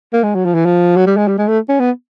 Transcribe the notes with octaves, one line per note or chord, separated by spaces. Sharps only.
A#3
G#3
F#3
F3
E3
F3
F#3
G3
G#3
G3
G#3
A3
C#4
B3